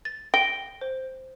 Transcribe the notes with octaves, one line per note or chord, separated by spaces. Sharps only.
A6
G5 A#6 D7 G7
C5